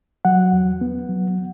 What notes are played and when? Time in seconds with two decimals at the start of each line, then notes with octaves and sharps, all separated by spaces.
0.25 F#3 F#5
0.53 E2
0.81 B3
1.09 F#3